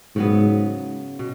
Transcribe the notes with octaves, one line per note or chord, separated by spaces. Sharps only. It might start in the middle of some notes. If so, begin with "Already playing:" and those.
G#2 C#3 F#3 B3
B2